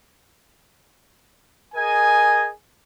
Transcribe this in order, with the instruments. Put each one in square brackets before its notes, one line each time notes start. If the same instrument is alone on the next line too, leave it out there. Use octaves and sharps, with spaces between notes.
[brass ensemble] G#4 A#4 D#5 G#5